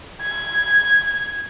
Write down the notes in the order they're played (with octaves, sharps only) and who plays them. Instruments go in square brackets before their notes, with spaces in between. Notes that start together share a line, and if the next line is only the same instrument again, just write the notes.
[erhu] G#6